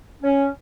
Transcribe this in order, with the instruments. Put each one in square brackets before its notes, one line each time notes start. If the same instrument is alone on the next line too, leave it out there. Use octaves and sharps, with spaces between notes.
[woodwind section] C#4